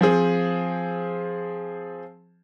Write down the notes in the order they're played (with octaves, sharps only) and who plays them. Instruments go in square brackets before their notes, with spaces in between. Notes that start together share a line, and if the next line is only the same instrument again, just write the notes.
[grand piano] F3 C4 G#4